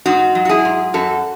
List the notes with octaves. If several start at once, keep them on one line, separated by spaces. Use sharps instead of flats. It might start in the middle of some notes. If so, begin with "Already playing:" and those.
G#2 D#4 F#4
F#3
F#4
E4 G#4
G#2
F#2 F#4 A4